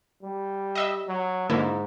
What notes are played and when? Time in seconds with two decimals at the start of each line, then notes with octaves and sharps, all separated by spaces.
0.23 G3
0.75 D#5 E5 E6
1.07 F#3
1.50 G#2 D3 A#3 E4